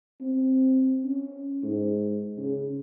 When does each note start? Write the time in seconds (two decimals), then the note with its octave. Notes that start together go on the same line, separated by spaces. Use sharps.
0.21 C4
1.05 C#4
1.63 G#2
2.37 C#3